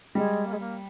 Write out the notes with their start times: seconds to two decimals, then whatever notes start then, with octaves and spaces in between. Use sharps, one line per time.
0.15 G3 G#3
0.45 A#3
0.52 G#3
0.59 A#3